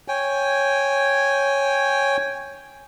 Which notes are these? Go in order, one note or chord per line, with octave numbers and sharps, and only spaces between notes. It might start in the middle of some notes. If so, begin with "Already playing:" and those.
C#5 G5 G#5